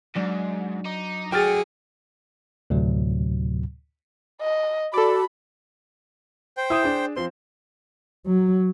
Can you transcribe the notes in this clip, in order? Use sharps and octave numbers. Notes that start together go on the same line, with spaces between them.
G#2 F#3 D4
D#4 D6
D3 F#4 G#4 G5 F6 A6
D2 A2 C3 F#3
D#5
F#4 A4 D5 B5
C5 G5
E4 D#6 E7
D4 G#4
F3 C4 C6
F#3